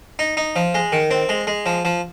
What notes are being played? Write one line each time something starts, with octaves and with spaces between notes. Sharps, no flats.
D#4
D#4
F3
G#3
D#3
C4
G#3
G#3
F3
F3